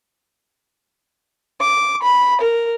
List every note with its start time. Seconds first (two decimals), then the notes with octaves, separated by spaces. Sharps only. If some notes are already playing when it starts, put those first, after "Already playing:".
1.60 D6
2.02 B5
2.41 A#4